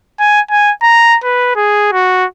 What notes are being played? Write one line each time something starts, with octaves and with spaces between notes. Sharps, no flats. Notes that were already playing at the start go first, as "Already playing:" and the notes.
G#5
G#5
A#5
B4
G#4
F#4